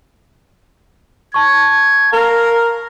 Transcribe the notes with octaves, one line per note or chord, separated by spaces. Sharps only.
A5 C#6 G#6
A#4 F5